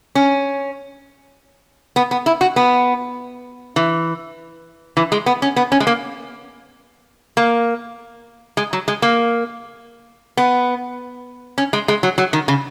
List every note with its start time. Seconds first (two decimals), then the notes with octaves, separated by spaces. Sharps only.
0.15 C#4
1.96 B3
2.11 B3
2.26 E4
2.41 F#4
2.56 B3
3.76 E3
4.97 E3
5.12 G#3
5.26 B3
5.42 C#4
5.56 B3
5.72 C#4
5.80 G#3
5.87 A#3
7.37 A#3
8.57 G#3
8.73 F#3
8.88 G#3
9.02 A#3
10.37 B3
11.58 C#4
11.73 G#3
11.88 G#3
12.03 F#3
12.18 F#3
12.33 D#3
12.48 C#3